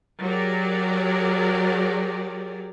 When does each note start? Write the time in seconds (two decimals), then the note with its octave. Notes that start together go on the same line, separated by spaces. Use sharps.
0.21 F#3 G4 G#4 A#4 D5